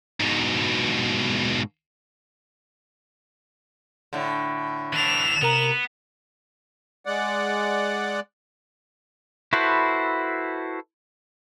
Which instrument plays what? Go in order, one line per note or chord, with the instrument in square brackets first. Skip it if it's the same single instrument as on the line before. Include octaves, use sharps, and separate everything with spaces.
[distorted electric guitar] G#2 B2
[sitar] A2 D3
[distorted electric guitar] E3 D4 [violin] E7 F7
[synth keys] C3 A#4 A#5 [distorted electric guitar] B3
[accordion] G#3 D5 F#5
[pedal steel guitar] E4 F#4 A4 B4 C5